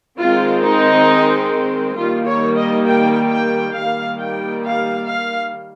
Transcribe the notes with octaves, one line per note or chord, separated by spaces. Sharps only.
D#3 G#3 C4 F4
D#4
D#3 G3 A#3 F4
C#5
D#5
G5
G5
D#3 G3 A#3 F5
G5
F5
F5